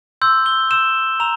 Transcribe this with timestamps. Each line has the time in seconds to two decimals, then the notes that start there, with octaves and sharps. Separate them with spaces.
0.22 C6 E6 G6
0.46 G7
0.71 C6 E6 G6 E7
1.20 A#5 E6 F7